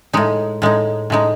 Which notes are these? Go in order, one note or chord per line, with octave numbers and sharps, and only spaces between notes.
A2 G#3 D#4
A2 G#3 D#4
A2 G#3 D#4